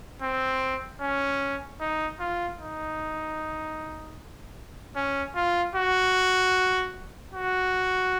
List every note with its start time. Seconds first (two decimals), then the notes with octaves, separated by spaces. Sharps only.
0.22 C4
1.01 C#4
1.80 D#4
2.20 F4
2.60 D#4
4.96 C#4
5.35 F4
5.75 F#4
7.33 F#4